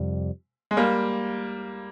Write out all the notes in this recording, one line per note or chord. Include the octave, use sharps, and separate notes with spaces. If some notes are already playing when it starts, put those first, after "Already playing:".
Already playing: F2 C3 G3
G#3
G3 A#3